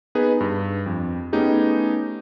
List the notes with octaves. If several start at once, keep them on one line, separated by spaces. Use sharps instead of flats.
B3 D#4 G#4 B4
G2
F2
A3 B3 C#4 D#4 G4 G#4